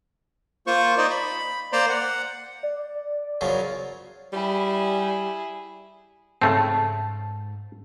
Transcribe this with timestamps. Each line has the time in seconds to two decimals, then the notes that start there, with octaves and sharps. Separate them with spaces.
0.67 A#3 F4 C5 C#6
0.98 D#4 C5 D5 D#5
1.10 B5
1.72 A#3 C5 D5 A#5 C6
1.89 F#5
2.63 D5
3.41 F#2 C#3 F3
4.33 G3 E4 G#4
6.42 G#2 C#3 A3 C4 A5